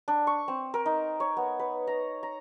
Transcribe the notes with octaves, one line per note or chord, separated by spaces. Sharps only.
D4
C#6
C4
A#4
D#4
C#5
B3
B4
A#5
A#5